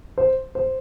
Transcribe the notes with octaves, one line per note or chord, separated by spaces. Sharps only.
C5
C5